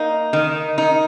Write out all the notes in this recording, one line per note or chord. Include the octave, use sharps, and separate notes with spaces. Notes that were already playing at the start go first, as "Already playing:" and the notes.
Already playing: A#3 D#4
D#3
D#4